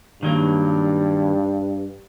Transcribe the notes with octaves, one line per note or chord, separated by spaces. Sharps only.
G2 D#3 F#3 A#3